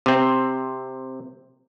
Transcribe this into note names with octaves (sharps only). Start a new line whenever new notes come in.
C3 C4